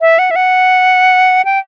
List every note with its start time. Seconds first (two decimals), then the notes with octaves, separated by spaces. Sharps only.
0.01 E5
0.19 F#5
0.31 E5
0.36 F#5
1.45 G5